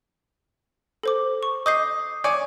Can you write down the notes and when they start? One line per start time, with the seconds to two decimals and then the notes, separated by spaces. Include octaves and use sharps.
1.03 A4 C5 D6
1.43 C#6
1.66 D#5 D6 G6 C7
2.24 C#5 D5 G#5